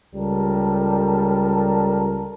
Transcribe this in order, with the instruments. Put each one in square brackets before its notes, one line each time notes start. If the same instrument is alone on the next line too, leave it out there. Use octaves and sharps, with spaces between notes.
[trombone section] C#2 G3 A4 A#4